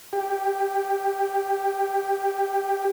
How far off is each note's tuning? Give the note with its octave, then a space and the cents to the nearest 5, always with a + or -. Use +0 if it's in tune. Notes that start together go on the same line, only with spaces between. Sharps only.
G4 +10